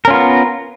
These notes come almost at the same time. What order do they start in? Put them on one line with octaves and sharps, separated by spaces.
A#4 C#4 F4 B3